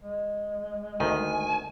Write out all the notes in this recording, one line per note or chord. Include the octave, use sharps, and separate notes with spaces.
G#3
D2 D#3 G#5